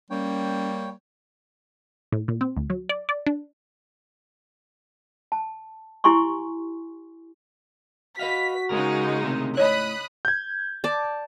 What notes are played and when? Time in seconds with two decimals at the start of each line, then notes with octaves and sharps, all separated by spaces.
0.10 G3 A#3 C#4 C#5 G5
2.12 A2
2.28 A#2
2.41 C4
2.57 D2
2.70 F#3
2.89 D5
3.09 D5
3.27 D4
5.32 A5
6.04 E4 G4 G#5 C6 C#6
8.19 F#4 B4 D#5 F5 B6
8.69 C#3 G#3 D#4 A#4
9.22 A2 C3 D#3
9.57 A2 C#5 D#5 B5 D#6 F#6
10.25 G6 G#6
10.84 D5 A5